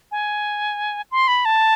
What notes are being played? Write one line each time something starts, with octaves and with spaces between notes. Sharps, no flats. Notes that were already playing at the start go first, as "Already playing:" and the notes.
G#5
C6
B5
A5